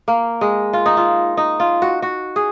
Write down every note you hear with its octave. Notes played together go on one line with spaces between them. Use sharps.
A#3
G#3
F4
D#4
F4
D#4
F4
F#4
F#4
G#4